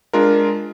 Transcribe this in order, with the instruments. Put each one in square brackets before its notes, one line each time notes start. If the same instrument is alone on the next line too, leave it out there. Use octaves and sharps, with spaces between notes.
[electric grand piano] G#3 D4 F4 A#4